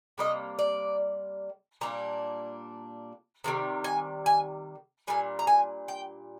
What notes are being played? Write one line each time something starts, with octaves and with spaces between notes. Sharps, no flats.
C3 G3 A#3 D#5
D5
A#2 G3 A#3 D4 A#5
C3 D#3 G3
G#5
G#5
A#2 G3 D4 G#5
A#5
G#5
G5